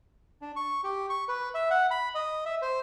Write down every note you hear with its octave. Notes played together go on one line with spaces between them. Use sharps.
D4
C#6
G4
C#6
B4
E5
F#5
B5
D#5
E5
C5